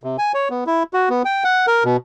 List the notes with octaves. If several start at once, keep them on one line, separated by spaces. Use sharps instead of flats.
C3
G#5
C#5
B3
E4
F#4
B3
G5
F#5
A#4
B2